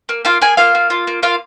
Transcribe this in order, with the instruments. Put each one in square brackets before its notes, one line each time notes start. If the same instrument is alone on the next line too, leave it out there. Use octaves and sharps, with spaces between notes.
[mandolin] A#3
A#3 F4 F5
A#3 G#4 G#5
A#3 F4 F5
A#3
F4
A#3
A#3 F4 F5